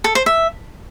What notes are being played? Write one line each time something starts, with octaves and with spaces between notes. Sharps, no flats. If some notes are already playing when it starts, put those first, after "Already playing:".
A4
C5
E5